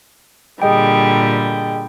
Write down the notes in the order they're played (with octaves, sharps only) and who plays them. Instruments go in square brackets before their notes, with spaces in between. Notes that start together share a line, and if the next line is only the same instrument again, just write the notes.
[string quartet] A#2 D3 G3 [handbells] G#4 D#5 G5